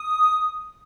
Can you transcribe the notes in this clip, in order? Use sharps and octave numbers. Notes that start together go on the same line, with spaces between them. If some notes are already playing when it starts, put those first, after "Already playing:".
Already playing: D#6